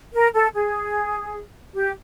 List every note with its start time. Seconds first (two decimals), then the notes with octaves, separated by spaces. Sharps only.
0.13 A#4
0.34 A4
0.54 G#4
1.75 G4